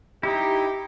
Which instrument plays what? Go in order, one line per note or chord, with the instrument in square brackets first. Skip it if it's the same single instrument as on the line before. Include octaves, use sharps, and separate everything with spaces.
[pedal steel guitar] D#4 E4 [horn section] G4